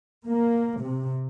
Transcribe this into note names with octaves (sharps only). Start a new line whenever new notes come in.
A#3
C3